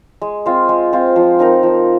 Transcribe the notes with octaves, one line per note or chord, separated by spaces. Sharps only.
G#3
C4 F4 C5
G#3
C4 F4 C5
F3
C4 D#4 A#4
F3